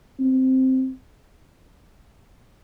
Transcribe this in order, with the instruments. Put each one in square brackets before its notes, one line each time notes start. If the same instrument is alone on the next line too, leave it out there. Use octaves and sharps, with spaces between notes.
[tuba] C4